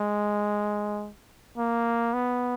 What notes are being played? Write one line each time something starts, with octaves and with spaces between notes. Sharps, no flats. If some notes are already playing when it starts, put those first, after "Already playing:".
Already playing: G#3
A#3
B3